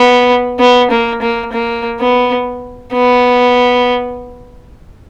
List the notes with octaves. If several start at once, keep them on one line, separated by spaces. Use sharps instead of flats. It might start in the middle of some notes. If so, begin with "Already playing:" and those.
Already playing: B3
B3
A#3
A#3
A#3
B3
B3